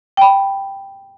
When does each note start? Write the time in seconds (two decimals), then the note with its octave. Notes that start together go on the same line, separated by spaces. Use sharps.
0.17 G5 B5